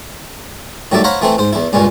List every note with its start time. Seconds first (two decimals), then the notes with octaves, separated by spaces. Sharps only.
0.92 A2 D#3 F#3 G3 D5 E5
1.04 C5 C#5 F5 F#5 A#5 B5
1.21 E3 A3 C4 E4
1.38 G#2 C5
1.53 E2 E4
1.73 C#2 G2 A#2 G#3 C#4